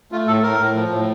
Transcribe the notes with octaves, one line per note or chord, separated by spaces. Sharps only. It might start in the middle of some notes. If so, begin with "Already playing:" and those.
A3 F4
A2 A4
A2 A#4
A2
F3
A2